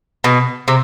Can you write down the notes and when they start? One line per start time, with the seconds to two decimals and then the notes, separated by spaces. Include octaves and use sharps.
0.24 B2
0.68 C3